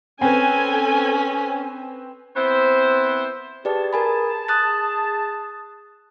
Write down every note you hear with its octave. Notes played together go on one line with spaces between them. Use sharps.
C4 C#4 A4 B4 G#5
B3 C4 E4 C5
G4 G#4 B4 D5 A5
A#4 G#5 B5
D#6 F#6 A6